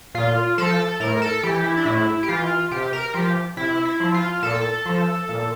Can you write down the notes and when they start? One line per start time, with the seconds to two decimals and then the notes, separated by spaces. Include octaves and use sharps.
0.14 A#2 F4
0.58 F3 A4
1.00 A2 A#4
1.22 A4
1.43 E3 G4
1.64 E4
1.77 D4
1.85 A2 E4
2.23 G4
2.29 E3 F4
2.71 C3 G4
2.93 A#4
3.14 F3 G4
3.57 C3 E4
3.85 E4
4.00 F3
4.14 F4
4.43 A#2 A4
4.86 F3
5.29 A#2